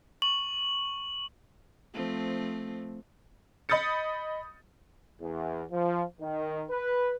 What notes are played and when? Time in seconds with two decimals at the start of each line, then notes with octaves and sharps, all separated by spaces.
0.22 C#6 F#7
1.94 F3 A3 C4
3.69 D#5 B5 D#6 G6 A6 C#7
5.21 E2
5.72 F3
6.21 D#3
6.71 B4